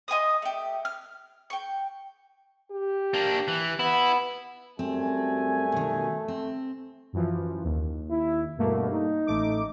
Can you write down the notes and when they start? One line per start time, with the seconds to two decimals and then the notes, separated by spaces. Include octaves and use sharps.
0.08 D#5 G#5 C6 D#6
0.42 A3 G4
0.85 F6
1.50 G5 C#6
2.71 G4
3.14 A#3 D4
3.48 E3
3.80 B3 E4
4.79 F#2 G3 A3 C4 G#5
5.72 B2 D#3
6.28 C4
7.13 F#2 E3 F3
7.64 D#2
8.10 E4
8.58 G2 B2 A3 A#3
8.90 D#4
9.27 A1 A3 D6